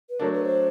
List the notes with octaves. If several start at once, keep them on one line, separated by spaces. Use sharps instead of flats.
B4
F#3 A3 D4 A#4
B4
C5